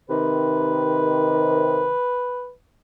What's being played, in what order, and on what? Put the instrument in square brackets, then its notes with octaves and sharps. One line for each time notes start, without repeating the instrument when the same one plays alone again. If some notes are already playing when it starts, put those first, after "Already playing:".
[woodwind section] C3 D#3 [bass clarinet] B4